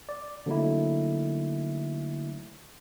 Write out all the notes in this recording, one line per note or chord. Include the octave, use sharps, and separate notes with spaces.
D5
D3 F#3 A3 A#3 D#4 E4